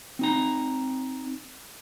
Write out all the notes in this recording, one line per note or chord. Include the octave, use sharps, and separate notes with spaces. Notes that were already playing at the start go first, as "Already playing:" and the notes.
C4 D#4 A#5